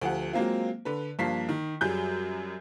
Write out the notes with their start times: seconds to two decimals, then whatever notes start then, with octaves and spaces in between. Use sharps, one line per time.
0.01 D2 F3 G4 F#5
0.33 F#3 G#3 A#3 C4 F4
0.85 D3 B4
1.19 G2 F3 A#3 B6 C7
1.49 D#3
1.81 F#2 F#3 G3 G#4 G6